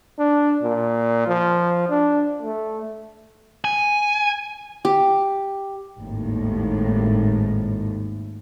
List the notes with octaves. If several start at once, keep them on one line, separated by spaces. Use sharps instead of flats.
D4
A#2
F3
D4
A3
G#5
G4
G#1 D#2 A2